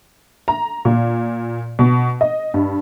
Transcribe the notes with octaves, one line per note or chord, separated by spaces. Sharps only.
A#5
A#2
B2
D#5
G2